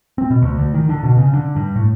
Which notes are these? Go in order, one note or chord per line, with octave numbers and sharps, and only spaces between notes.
C4
B2
D2
D2
D#3
D3
B2
C#3
D3
G2
A2